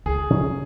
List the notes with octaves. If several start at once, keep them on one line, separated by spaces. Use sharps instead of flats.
C#2 G#4
C#3 F#3 C#4